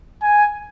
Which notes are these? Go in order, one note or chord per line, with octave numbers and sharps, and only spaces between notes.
G#5